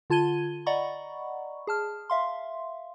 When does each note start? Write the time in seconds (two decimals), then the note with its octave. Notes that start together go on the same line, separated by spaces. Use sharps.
0.10 D3 F4 A5 G#6 D#7 G7
0.66 D5 D#5 F#5 A#5 B5 C#6
1.67 G#4 A5 F6
2.10 E5 F5 C6